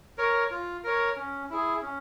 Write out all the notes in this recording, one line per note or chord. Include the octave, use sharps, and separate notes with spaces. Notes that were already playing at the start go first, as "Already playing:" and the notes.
A#4 C#5
F4
A#4 C#5
C#4
E4 G#4
C#4